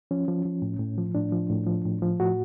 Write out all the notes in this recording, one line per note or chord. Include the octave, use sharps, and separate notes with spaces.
F3 C#4
F3
F3
A2
A2
F3
A2 D4
F3
A2
F3
A2
F3
A2 F#4